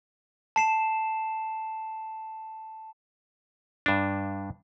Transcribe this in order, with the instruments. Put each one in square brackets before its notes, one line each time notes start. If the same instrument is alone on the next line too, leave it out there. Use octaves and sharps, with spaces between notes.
[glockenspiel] A5 C7 E7
[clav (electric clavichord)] G2 D4